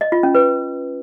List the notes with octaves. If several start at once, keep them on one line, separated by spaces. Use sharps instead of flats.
D#5
F4
C#4
B4